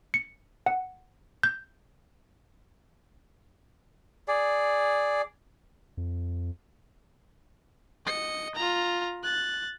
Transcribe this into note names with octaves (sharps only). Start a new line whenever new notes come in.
C#7
F#5
G6
G#4 D5
F2
D#5 C#7
F4 A#5
F#6 A6